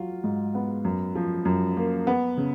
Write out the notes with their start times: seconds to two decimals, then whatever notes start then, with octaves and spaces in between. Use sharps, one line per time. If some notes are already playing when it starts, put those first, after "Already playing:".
Already playing: F#3 F4
0.24 G#2
0.55 B3
0.85 F#2
1.15 F3
1.45 F#2
1.77 A#3
2.07 B3
2.37 C#3